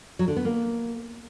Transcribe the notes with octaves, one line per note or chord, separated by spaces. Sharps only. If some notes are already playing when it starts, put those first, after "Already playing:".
F#3
D3
B3
A#3